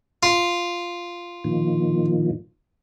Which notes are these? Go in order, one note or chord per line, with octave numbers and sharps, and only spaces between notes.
F4
A#2 D#3 F3